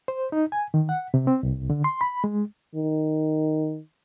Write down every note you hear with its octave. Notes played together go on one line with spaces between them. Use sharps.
C5
D#4
G#5
D#3
F#5
C3
C4
C2
D3
C6
B5
G#3
D#3